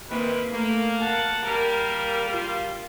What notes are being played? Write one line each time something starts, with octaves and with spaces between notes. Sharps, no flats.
C3 D#3 E3 A#3 B4
A3 A#3
F#5 A5
G3 A#3 G4 A#4
F4